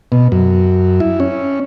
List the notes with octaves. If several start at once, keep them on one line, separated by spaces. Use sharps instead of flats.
B2
F#2
E4
C#4